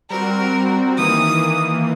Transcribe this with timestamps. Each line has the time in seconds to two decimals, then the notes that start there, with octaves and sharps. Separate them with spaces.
0.10 G3 C4 F#4 A#4
0.98 D#3 E3 A#3 D#6